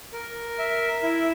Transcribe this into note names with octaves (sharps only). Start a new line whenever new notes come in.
A#4
E5
E4